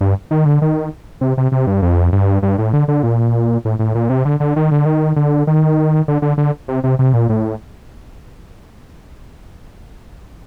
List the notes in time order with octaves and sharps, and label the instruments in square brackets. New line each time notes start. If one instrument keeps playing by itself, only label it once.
[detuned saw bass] G2
D#3
D3
D#3
C3
C3
C3
G2
F2
G2
G2
A2
D3
D3
A#2
A2
A2
A#2
C3
D3
D3
D#3
D3
D#3
D3
D#3
D3
D3
D3
C3
C3
C3
A#2
A2